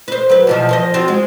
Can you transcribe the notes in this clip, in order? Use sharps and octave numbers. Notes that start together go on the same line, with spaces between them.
B4 C5
F#3 B4
E2 B2 F3
F3 C5 D#5
C4 F4 F#4
G#3